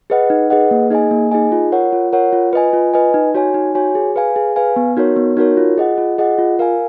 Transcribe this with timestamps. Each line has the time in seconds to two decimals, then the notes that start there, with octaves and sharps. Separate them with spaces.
0.10 G#4 B4 D#5 F#5
0.30 D#4
0.50 G#4 B4 D#5 F#5
0.71 A#3
0.90 D#4 G#4 D#5 G#5
1.11 A#3
1.32 D#4 G#4 D#5 G#5
1.52 F4
1.72 A#4 C#5 F#5
1.93 F4
2.13 A#4 C#5 F#5
2.33 F4
2.53 B4 D#5 G#5
2.73 F4
2.94 B4 D#5 G#5
3.14 D#4
3.35 F#4 C#5 G#5
3.54 D#4
3.75 F#4 C#5 G#5
3.95 G#4
4.16 B4 F5 G#5
4.36 G#4
4.56 B4 F5 G#5
4.76 B3
4.97 D#4 F#4 A#4 C#5
5.16 B3
5.37 D#4 F#4 A#4 C#5
5.57 F4
5.78 G#4 D#5 F#5
5.98 F4
6.18 G#4 D#5 F#5
6.38 F4
6.59 A#4 F5 G#5